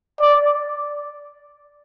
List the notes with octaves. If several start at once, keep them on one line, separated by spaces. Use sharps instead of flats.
D5